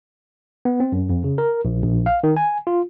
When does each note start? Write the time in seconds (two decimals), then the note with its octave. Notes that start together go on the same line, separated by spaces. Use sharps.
0.65 B3
0.80 C4
0.92 F#2
1.10 F2
1.24 C#3
1.38 A#4
1.65 A#1
1.84 A#1
2.06 F5
2.24 D#3
2.37 G#5
2.67 F4